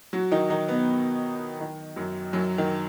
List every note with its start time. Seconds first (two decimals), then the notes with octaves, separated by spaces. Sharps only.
0.13 F#3 F#4
0.32 D#3 D#4
0.50 D#3 D#4
0.68 B2 B3
1.60 D#3
1.96 F#2 F#3
2.33 F#2 F#3
2.58 D#3